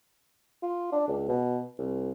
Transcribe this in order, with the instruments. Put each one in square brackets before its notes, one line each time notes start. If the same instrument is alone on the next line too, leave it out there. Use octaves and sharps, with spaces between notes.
[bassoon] F4
D4
C#2
B2
C2